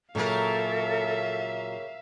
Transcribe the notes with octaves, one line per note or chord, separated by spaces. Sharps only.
A#2 C#3 F#3 A#3 A4 A#4 E5 F5